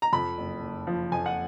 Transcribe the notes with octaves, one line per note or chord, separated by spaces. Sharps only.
A#5
F2 B5
F#1
F#1
F3
F2 G#5
F#5